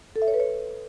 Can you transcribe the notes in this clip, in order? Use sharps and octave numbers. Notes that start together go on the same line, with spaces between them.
A4
E5
C#5
B4
C#5